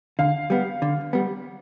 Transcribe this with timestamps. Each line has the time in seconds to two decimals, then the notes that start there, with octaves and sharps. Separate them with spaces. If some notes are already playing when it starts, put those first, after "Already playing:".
0.19 D3 F5
0.50 G3 B3
0.82 D3
1.13 G3 B3